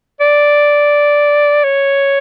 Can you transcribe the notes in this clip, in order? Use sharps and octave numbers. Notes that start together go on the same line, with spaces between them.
D5
C#5